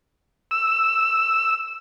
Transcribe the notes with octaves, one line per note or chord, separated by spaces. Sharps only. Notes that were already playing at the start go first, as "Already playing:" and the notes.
E6